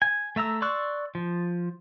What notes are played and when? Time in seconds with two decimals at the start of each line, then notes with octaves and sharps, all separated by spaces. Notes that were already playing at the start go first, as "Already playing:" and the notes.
0.02 G#5
0.36 A3 E5 A#5 E6
0.62 D5 C6 C#6 E6 F#6
1.15 F3